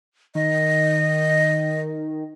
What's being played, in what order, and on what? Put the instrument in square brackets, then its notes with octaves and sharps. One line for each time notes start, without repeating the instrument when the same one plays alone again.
[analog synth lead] D#3 [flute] D#5